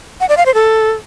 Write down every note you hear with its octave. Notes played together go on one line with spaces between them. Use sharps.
F#5
D5
F5
C5
A4